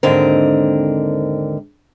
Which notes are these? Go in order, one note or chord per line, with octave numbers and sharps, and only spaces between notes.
D#2 G#2 D3 C4 A#4